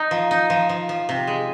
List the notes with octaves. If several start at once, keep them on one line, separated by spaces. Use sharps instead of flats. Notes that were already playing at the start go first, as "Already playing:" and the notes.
Already playing: D#4
F3
D#4
F3
F3
F3
C3
G#3